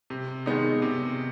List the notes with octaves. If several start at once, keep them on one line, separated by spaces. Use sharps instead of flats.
C3
D#3 G#3 B3 D#4
C3